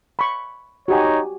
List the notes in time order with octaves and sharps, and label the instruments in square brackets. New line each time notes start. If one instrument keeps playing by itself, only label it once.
[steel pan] B5 C#6
[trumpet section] D#4 C#5 [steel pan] F#4 G4 G#5